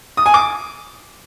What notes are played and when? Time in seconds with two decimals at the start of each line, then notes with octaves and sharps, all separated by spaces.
0.17 D#6
0.26 G#5
0.34 D6